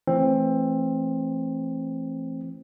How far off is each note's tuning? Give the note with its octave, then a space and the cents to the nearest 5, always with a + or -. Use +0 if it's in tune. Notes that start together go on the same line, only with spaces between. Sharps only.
E3 +35 A3 +10 C4 +20